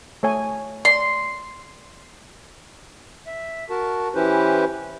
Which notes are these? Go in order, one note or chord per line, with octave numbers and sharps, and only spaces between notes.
A3 C#5 G#5
D5 C6
E5
F#4 A#4 A5
E3 C#4 E4 G4 B4 C5